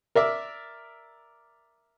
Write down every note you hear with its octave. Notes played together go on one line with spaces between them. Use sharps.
A#4 D5 E5